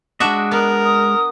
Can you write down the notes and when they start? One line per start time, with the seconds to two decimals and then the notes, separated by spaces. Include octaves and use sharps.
0.20 G#3 D4 F#4 D#5 E5
0.52 B3 A#4
0.85 D#6